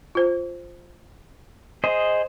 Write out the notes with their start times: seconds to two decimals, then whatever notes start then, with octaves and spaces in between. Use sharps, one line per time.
0.15 F4 C5
1.84 G#4 C5 D#5